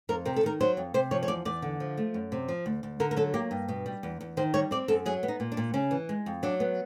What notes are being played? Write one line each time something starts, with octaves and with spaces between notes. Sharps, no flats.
F2 A#4
C3 A#4
A4
D#3 A#4
F#3 C5
F2
C3 C5
F3 C#5
C#5
E2 D5
E2 D5
D3
F3
A3
F#2
C3
F3
D2
D2
D3 A#4
A#4
F#3 A4
A#3 G4
G2
B2
G3
E2
E2
D#3 C5
G3 C#5
C4 D5
F#2 A4
F#3 G#4
B3
D#4
A#2
D4
A#2
C#3 C#4
E3
G#3
F2
F#3 D4
B3